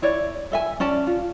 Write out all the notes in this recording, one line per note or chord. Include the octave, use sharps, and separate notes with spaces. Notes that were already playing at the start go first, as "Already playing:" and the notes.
E4 C#5 D5
A4 E5 G#5
C#4 D5 A5
F4